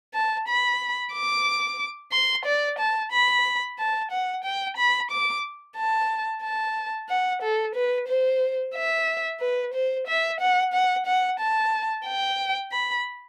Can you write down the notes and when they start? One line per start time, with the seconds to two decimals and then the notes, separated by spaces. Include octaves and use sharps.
0.14 A5
0.48 B5
1.13 D6
2.12 C6
2.45 D5
2.79 A5
3.12 B5
3.79 A5
4.11 F#5
4.44 G5
4.77 B5
5.11 D6
5.77 A5
6.43 A5
7.09 F#5
7.42 A4
7.75 B4
8.08 C5
8.75 E5
9.40 B4
9.74 C5
10.07 E5
10.40 F#5
10.73 F#5
11.06 F#5
11.40 A5
12.06 G5
12.72 B5